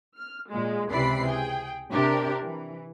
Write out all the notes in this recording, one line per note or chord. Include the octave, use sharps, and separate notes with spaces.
F6
A#2 G#3
C#2 C3 E3 D5 B5 C7
G#4 G5
C3 D4 G4 A#4
E3